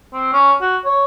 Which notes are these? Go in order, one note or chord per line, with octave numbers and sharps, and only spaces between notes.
C4
C#4
F#4
C#5